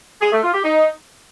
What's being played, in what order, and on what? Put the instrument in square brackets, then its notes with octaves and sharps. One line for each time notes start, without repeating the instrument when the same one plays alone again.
[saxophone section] G#4
A3
F4
G4
D#4